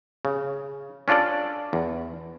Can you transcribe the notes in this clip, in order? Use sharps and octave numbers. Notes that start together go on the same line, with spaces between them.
C#3
C#4 D4 F4 A4 D5
E2